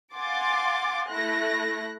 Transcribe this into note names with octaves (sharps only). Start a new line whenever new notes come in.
F5 F#5 G#5 C6 D6 A6
A3 E4 F#6 A#6